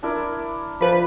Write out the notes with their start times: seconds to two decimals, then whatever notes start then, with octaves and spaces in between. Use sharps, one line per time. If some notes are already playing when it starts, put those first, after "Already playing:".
0.03 D4 E4 A#4
0.81 F3 B4 B5